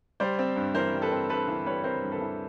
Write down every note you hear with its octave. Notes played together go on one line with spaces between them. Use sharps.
G3 C5 D5
C4
G2
E3 A#4 C5
G3
A4 B4
C4
G2 A4 B4
E3
G3 B4 C#5
C4 A#4 C5
G2
A4 B4
E3